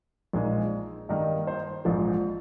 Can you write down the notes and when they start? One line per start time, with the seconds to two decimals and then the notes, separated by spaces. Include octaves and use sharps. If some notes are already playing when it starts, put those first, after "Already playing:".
0.33 A#1 A#2 G#3 D#4
1.09 G2 D#3 A#3 D#4 A#4
1.47 C5
1.85 A#1 G#2 F3